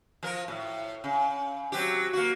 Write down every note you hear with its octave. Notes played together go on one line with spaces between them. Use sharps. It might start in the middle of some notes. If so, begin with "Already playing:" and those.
F3 A#4
A2
C#3
F#3 C4 G4
A#3 F#4